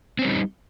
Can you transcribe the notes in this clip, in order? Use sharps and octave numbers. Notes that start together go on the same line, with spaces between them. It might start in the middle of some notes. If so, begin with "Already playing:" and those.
G3 C4 C#4 D#4